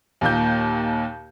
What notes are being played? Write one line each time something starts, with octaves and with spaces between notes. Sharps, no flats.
D#2 A#2 G6